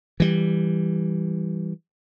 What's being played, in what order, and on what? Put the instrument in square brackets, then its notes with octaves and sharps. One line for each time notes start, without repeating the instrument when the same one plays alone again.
[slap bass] E3 G3